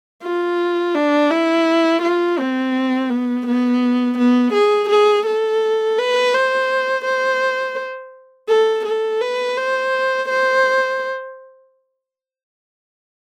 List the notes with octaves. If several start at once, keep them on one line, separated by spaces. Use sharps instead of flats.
F4
D4
E4
F4
C4
B3
B3
B3
G#4
G#4
A4
B4
C5
C5
A4
A4
B4
C5
C5